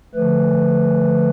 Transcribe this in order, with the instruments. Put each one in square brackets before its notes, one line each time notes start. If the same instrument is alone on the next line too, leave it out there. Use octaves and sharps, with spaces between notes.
[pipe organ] D3 F3 A3 B4